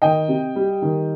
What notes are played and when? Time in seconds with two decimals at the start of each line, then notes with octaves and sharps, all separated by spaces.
0.02 D#3 D#5 G5
0.28 C3
0.56 G3
0.82 D#3